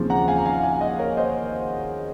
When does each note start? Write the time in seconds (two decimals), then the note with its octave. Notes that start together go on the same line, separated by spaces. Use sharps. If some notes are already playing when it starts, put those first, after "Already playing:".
Already playing: D#2 C#3 F3 C4
0.10 F#5 A#5
0.28 F5 G#5
0.38 A#5
0.45 F5 G#5
0.63 F5 G#5
0.81 D#5 F#5
0.99 A#4 C#5
1.17 C5 D#5